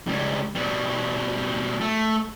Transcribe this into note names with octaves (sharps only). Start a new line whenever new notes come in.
C#2 G3
B2 G3
A3